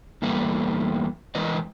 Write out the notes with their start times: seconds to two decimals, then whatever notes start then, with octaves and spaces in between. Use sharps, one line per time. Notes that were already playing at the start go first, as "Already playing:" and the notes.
0.22 E2 G3 A3 A#3 B4
1.35 E3 G#3 A#4 B4 D#5